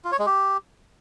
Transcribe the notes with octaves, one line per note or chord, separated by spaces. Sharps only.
F4
C#5
G#3
G4